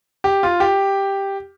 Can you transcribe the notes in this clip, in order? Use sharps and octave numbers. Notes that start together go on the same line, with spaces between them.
G4
F4
G4